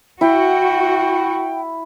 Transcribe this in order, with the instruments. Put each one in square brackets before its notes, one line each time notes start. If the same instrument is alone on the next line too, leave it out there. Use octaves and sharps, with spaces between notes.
[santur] E4 [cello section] F#4 [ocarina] G5